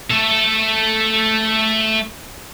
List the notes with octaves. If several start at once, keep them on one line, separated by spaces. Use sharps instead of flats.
A3 A4